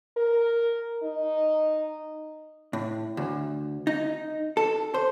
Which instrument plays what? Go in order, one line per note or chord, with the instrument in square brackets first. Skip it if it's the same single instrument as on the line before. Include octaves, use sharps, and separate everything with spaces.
[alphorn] A#4
D#4
[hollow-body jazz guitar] A2
D2
D#4
A4
C5